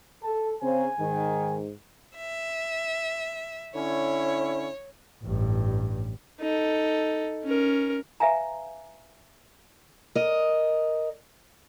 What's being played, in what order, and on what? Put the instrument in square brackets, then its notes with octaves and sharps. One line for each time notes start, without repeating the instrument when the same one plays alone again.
[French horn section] A4 [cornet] A5
[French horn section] C#3 C5 [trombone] C4 [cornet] G#5
[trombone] G#2 [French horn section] D#3
[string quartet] E5
[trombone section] D3 C#4 E4 [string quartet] C#5
[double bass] A1 G2
[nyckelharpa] D#4 A4
C#4 A#4
[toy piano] B4 E5 F5 G#5 A#5
[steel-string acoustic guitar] A#4 D#5